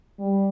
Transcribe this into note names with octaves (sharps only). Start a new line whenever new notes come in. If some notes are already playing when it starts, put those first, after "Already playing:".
G3